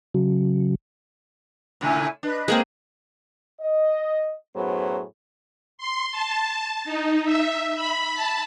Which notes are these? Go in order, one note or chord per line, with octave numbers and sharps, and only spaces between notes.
C#3 F#3
A#2 C#3 A3 E4 G#5
D4 B4 D#5
G#3 A#3 C4 G#4 A#4
D#5
F#2 A2 F#3 B3 G#4 C5
C6
A5
D#4
E5
B5
A5